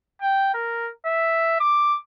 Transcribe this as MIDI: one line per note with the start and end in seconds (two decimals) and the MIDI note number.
0.22 0.53 79
0.54 0.90 70
1.06 1.57 76
1.61 1.98 86